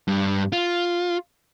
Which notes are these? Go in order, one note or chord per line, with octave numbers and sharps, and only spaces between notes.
G2
F4